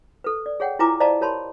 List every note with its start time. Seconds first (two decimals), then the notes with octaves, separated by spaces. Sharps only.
0.24 A4 B4
0.46 D5
0.60 G#4 C#5 F#5 G5
0.79 E4 F4 B4 G#5 A#5 D6
1.00 C5 D5 D#5 F5 A5 A#5
1.21 G4 A#4 C#5 A5 B5 C6